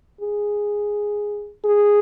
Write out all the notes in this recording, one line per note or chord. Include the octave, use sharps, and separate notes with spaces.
G#4
G#4